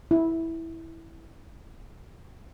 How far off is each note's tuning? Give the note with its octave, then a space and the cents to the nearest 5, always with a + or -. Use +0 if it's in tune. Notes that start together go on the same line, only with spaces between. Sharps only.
E4 -10